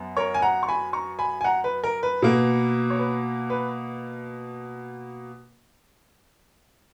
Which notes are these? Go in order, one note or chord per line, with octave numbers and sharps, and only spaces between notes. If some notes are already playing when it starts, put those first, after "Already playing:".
Already playing: F#2 B3
A#4 C#5
G#5
F#5 A#5
C#6
G#5 B5
A#5 C#6
G#5 B5
G#5
F#5 A#5
B4
A#4
B4
B2 A#3
C#5
B4
B4